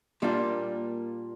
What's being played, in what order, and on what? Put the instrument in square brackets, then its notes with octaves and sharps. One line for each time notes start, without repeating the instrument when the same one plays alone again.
[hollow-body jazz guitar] A#2 G3 A#3 D4 F4